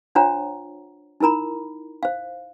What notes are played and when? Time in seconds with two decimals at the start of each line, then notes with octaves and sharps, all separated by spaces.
0.15 D4 F4 C5 C#5 F#5 A#5
1.20 D#4 E4 A#4 A#5 B5
2.03 C5 F5